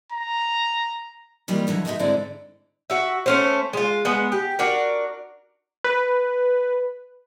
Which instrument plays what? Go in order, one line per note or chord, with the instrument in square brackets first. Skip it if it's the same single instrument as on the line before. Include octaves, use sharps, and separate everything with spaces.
[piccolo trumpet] A#5
[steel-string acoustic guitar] D#3 E3 G3 A#3 F4
F2 D3 E3 F#3
D2 G#2 D#4 C#5 D#5 E5
G#2 D3 G#3 C4 E4 D5
[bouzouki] F#4 E5
A3 C#4 C5
G#3 F4
G#3 B3
G4
D4 F#4 A#4
[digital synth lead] B4